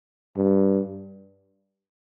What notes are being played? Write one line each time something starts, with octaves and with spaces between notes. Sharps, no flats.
G2